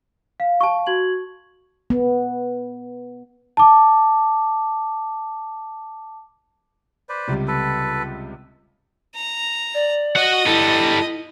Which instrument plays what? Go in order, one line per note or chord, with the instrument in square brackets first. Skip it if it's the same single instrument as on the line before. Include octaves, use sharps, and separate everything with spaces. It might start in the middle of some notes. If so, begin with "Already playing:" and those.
[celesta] F5
[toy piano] A5 C#6
[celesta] F#4 G#6 F#7
[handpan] B3
[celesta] A5 D6
[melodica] B4 C5 D5
[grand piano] C#2 C3 G3
[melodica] A4 B4
[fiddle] A#5
[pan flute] D5
[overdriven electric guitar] F#4 F#5 [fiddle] D#5
[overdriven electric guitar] G3 A4 [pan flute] E4